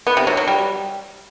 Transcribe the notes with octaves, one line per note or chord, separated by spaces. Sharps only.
B3
C3
F#3
F#3
G3